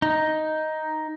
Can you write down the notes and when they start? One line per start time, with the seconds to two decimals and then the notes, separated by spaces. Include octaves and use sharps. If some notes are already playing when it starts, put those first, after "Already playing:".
0.02 D#4